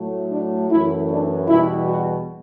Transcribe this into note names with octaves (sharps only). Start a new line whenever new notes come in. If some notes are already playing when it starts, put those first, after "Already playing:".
Already playing: A2 F#3 A3
D4
F#2 E3 A3 E4
D4
E2 B2 G3 E4
F#4